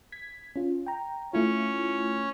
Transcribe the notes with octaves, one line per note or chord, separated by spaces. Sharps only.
G#6 B6
C#4 F4
G5 A#5
A3 C#4 E4 F4 C#5